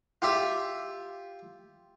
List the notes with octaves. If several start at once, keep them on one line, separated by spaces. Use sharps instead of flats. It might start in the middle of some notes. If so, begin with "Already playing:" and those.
F4 G4 E5